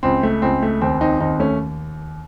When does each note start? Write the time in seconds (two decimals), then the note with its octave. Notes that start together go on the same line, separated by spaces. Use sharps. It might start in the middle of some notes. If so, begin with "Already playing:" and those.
0.03 C#2 C4
0.23 A3
0.42 C#2 C4
0.62 A3
0.81 D#2 C4
1.01 C4 D#4
1.20 D#2 C4 D#4
1.40 A3 C#4